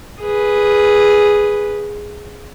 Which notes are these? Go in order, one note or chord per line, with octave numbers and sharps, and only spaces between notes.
G#4 B4